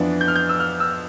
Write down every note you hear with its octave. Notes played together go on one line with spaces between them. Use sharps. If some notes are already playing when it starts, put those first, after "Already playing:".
Already playing: F2 E3 B3 D4 F4
G6
F6
G6
E6
F6
E6